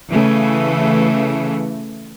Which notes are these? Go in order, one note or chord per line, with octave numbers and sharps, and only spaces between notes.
C#3 E3 A3